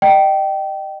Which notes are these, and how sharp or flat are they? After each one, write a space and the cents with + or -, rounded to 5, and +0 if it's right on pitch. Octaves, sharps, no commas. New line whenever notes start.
D#5 -30 G5 -20